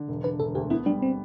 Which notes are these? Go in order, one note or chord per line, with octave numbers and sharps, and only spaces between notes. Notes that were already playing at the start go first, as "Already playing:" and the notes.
Already playing: D3
E1
D3 B4
E1 A4
D2 G4
B3 E4
G3 D4
C4